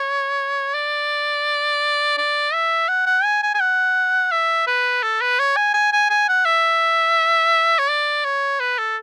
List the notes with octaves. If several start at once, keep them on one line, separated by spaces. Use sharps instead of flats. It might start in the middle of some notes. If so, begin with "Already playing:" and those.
Already playing: C#5
D5
D5
E5
F#5
F#5
G#5
G#5
G#5
F#5
E5
B4
A4
B4
C#5
G#5
G#5
G#5
G#5
F#5
E5
C#5
D5
C#5
B4
A4